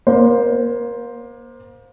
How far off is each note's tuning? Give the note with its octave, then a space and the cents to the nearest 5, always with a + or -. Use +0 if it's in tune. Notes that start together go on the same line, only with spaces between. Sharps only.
A#3 +30 C5 +0